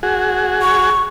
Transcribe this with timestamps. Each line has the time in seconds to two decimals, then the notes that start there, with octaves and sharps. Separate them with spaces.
0.03 F#4 G#4
0.62 C#6